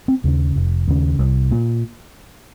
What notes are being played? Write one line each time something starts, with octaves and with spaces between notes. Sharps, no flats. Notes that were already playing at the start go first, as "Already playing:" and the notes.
C4
D#2 C#3
F1
D#2 C#3
C2
A#2